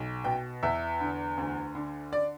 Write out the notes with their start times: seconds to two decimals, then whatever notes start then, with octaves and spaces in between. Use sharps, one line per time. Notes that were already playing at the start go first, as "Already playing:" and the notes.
Already playing: B1
0.24 B2 G5
0.63 E2 E5
1.00 D3
1.37 D2
1.75 D3
2.13 D5